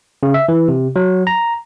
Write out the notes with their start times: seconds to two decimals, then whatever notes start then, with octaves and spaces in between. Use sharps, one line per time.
0.23 C#3
0.34 E5
0.49 E3
0.68 C3
0.96 F#3
1.27 A#5